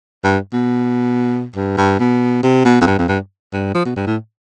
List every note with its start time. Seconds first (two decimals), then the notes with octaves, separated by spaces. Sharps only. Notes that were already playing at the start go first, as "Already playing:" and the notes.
0.24 G2
0.54 B2
1.56 G2
1.77 G2
2.00 B2
2.43 C3
2.65 B2
2.81 F2
2.87 G2
2.98 F2
3.09 G2
3.53 G2
3.75 F3
3.85 B2
3.96 G2
4.07 A2